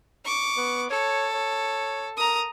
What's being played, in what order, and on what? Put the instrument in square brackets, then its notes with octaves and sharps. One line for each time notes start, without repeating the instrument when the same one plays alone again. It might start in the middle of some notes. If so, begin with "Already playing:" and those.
[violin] C#6 D6
[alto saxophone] B3
[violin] A4 [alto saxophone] C#5
[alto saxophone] C#5
[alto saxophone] A#4 [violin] A#5 D#6